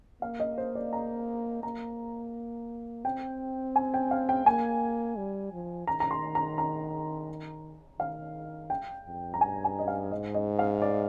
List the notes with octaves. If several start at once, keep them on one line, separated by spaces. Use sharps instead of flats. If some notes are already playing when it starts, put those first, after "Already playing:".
A#3 F5
D#5
C5
D5
A#5
A#3 A#5
C4 G5
G#5
G5
F5
G5
A#3 G#5
G3
F3
D#3 A#5
A#5
C6
A#5
A#5
D#3 F5
G5
F2
A#5
G2 G#5
G#5
D#5
F5
G#2 D#5
D#5
F5
D5